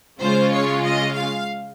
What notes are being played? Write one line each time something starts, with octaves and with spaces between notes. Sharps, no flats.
C#3 G#3 C#4 F4 C5
C#5
D#5
F5